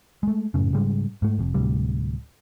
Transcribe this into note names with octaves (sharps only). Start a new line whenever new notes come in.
G#3 A3
F#2 A2 C#3
G#2 C#3 G3 G#3
G#2 A3
F1 F2
D1 D2 C3 G3